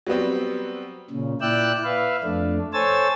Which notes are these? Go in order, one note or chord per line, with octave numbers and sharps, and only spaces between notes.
F#3 G3 B3 C4
A#2 C#3
A#2 E4 D5 G5 E6 F#6
B4 E5 F5
F2 A3 D4
A4 C5 C#5 G#5 E6 A6